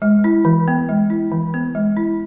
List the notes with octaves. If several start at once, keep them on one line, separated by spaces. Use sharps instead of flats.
G#3
E4
E3
B3
G#3
E4
E3
B3
G#3
E4